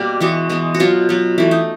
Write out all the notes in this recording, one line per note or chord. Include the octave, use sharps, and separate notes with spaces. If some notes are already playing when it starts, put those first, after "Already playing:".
Already playing: B2 G3 A#3
E3 G#3 B3 F#4
E3 G#3 B3
F#4
B2 F#3 B3 F4
B2 F#3 B3
E3 A3 E4
D#4